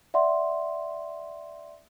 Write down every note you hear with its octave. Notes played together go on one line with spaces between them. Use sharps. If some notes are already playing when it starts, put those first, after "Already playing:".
D5 E5 F#5 C6